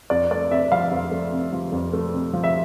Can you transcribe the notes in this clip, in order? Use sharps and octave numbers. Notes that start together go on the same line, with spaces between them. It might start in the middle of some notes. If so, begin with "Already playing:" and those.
F2 D5
A3 D5
C3 E5
F3 F5
F2
A3
C3
F3
F2
A3
C3
F3
E5